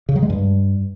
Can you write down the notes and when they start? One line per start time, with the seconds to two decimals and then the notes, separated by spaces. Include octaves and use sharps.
0.09 C#3
0.16 F#3
0.23 G#3
0.30 G2